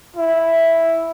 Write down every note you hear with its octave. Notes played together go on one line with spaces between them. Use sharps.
E4